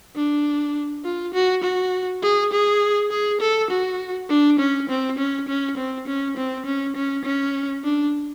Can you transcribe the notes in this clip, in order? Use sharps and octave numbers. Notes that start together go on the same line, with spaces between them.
D4
F4
F#4
F#4
G#4
G#4
G#4
A4
F#4
D4
C#4
C4
C#4
C#4
C4
C#4
C4
C#4
C#4
C#4
D4